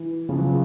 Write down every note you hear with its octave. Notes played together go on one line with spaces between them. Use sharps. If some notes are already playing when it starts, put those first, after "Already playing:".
Already playing: E3
C#3 F3
F#3
F3